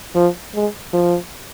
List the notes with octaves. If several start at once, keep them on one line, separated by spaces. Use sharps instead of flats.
F3
G#3
F3